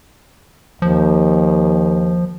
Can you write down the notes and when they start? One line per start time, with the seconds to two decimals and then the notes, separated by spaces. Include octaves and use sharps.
0.82 D#2 F3